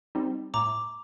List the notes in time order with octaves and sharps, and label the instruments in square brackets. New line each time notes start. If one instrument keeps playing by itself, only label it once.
[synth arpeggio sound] G3 C4 D#4
[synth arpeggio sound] A2 [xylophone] A#5 D6